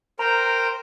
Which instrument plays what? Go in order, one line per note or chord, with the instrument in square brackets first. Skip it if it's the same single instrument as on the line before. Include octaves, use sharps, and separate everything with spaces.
[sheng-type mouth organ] A#4 C5 G5 [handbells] A#5